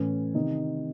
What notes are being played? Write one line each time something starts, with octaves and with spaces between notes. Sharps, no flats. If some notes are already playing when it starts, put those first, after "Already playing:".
Already playing: A2 E3 C#4
C3 D#3 D#4